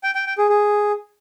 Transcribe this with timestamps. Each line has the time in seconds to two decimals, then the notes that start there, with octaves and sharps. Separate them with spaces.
0.03 G5
0.15 G5
0.26 G5
0.38 G#4
0.49 G#4